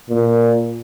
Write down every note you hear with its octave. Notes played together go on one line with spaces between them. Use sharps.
A#2